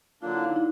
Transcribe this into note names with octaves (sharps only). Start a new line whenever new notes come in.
D3 F#3 A#3 D4 F4
E4
D#4
E4